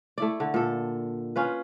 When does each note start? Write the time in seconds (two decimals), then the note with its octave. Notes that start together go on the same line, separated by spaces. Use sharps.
0.18 A3 E4 D5
0.40 D3
0.54 A#2 A4
1.36 C#4 F4 B4